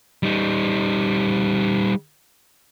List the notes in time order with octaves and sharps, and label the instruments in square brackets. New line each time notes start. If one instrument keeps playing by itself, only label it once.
[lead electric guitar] G3 D#4